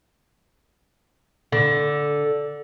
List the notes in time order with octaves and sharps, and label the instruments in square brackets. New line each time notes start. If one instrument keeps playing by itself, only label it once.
[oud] D3